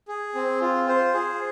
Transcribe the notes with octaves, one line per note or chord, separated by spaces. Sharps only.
G#4
C4
F4
C5
G#4